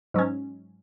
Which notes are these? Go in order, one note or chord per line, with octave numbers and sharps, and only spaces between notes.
G#2 F#3 C#4